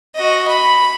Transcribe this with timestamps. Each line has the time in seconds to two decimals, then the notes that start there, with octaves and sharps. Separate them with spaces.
0.15 F#4 D#5
0.48 B5